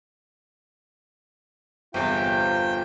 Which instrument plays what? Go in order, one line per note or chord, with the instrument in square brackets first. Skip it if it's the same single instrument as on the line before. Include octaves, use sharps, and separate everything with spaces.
[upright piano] G1 E2 [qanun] C3 D6 [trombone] F4 [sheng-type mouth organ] G5